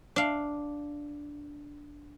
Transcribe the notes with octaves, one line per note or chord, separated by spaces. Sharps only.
D4 F5